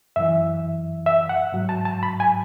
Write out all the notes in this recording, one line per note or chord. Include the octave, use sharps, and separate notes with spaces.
F#2 E3 E5
E5
F#5
G#2 F#3
A5
A5
B5
G#5